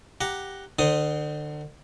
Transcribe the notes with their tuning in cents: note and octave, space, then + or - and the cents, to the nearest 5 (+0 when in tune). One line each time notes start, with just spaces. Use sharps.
G4 +0 F#5 +0 A#5 +0
D3 +35 C5 +0 D#6 +0